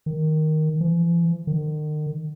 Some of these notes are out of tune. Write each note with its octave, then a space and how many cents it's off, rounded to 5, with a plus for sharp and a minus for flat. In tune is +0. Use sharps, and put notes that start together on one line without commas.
D#3 +0
E3 +45
D#3 -40